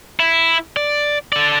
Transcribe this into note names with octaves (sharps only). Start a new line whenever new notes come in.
E4
D5
A4 D5